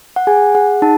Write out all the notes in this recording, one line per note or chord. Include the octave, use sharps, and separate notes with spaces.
F#5
G#4 G#5
G#4 F#5
D#4 A5